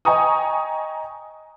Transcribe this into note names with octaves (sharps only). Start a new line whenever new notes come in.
D#5 G5 G#5 A#5 C#6 D#6